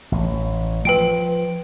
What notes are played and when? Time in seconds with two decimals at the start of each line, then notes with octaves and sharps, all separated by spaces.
0.12 A1
0.85 F3 B4 G5 D7